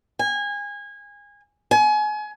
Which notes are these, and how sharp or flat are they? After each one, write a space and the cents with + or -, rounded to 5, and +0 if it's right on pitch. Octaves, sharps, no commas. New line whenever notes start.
G#5 -25
G#5 +30